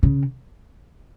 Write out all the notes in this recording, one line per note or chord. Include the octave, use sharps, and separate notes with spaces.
C#3